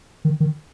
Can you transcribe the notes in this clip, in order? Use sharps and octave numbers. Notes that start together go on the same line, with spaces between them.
D#3
D#3